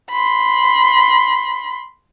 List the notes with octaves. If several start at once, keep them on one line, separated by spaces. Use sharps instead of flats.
B5 C6